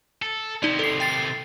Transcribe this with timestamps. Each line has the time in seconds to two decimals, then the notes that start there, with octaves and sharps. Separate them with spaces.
0.22 A4
0.63 C3 D#3 D#4 D5
0.79 A4 C7
1.00 G5 A6 C7